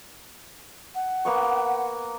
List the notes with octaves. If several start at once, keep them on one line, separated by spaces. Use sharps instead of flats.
F#5
A#3 B3 C#6